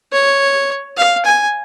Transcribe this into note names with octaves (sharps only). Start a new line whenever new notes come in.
C#5
F5
G#5